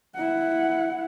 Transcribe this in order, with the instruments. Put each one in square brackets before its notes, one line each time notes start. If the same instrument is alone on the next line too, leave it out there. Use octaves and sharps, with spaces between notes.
[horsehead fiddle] E4 F#5